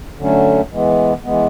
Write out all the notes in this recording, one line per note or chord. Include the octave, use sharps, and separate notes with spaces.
D3 F#3 A3 C#4
E3 G#3 B3
E3 G#3 B3